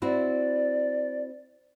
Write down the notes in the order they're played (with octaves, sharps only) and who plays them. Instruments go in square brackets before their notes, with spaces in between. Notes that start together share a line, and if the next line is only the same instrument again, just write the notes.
[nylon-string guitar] C4 E4 F#4 [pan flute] D5